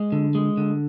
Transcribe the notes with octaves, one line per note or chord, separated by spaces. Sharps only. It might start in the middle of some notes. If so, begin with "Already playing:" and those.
Already playing: G#3
D3
G#3
D3